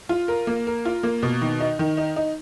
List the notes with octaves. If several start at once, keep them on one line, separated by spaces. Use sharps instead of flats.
F4
A#4
A#3
A#4
F4
A#3
B2
D#3
D#4
D#3
D#4
D#4